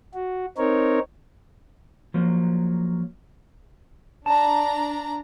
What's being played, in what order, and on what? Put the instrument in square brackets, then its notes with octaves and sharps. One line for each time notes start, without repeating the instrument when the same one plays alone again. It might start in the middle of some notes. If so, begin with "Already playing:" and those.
[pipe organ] F#4
C4 D#4 A#4 C#5
[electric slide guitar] F3 F#3 A#3
[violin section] D4 A#5 [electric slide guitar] A5